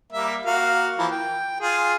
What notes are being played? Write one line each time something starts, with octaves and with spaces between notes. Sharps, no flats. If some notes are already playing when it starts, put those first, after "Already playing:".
G3 A#3 E5
A#3 F#4 F5
E3 F3 A#3
G5
F4 G#4